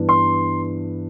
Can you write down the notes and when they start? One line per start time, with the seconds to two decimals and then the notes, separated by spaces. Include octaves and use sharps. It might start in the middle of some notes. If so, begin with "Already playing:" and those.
Already playing: G2 E3 B3 D4
0.09 C6